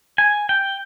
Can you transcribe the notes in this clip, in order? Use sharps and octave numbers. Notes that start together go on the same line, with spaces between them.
G#5
G5